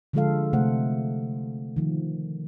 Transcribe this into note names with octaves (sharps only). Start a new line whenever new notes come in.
D3 F3 G#3 F4 A4 F5
C3 A3 C5 F#5
D#3 F3